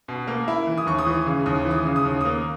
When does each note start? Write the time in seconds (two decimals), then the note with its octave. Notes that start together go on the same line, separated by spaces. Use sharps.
0.08 B2
0.27 A#3
0.48 E4
0.67 E3
0.78 D#6
0.87 D#2 C#6
0.98 D#6
1.07 E3
1.26 C#3
1.46 D#2 D#6
1.65 E3
1.71 D#6
1.85 C#3
1.96 D#6
2.05 D#2
2.21 A#3 D#6